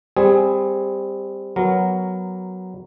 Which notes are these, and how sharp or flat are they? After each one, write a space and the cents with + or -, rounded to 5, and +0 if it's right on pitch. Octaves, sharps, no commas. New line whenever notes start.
G3 +20 C4 +0 G#4 +0
F#3 +0 B3 +0 A#4 +0